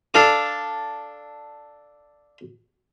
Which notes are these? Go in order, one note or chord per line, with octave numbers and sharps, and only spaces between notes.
D4 A4 F5 D6